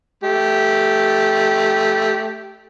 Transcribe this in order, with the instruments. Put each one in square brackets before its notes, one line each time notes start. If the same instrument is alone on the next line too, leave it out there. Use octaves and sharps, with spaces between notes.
[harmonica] A3 G4